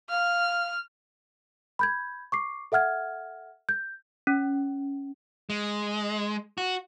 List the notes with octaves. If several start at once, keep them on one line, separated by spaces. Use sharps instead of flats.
F5 F6
B5 G6 G#6
C#6 D6 C7
A4 E5 F#5 F6 G#6
G6
C#4
G#3
F#4